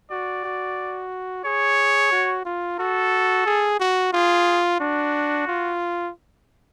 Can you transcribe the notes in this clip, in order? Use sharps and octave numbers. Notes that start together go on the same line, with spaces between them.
F#4 D5
F#4
G#4 C#5
F#4
F4
F#4 A4
G#4
F#4
F4 G#4
D4 F#4
F4